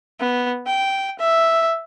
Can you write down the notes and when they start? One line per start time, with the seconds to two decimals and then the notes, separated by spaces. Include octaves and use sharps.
0.20 B3
0.67 G5
1.19 E5